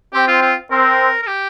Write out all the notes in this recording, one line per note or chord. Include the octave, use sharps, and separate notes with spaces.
C4 G4
F4
F4
C4 A#4
A#4
G4